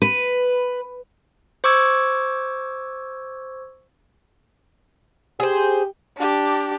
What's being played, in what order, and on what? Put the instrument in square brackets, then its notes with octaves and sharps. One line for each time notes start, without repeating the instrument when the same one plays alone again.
[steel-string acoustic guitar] B4
[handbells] C5 C#6 D6 E6 G#6
[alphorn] G4 [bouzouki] G#4 C5
[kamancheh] D4 G4